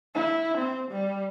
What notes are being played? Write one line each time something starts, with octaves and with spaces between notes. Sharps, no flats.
E4
C4
G3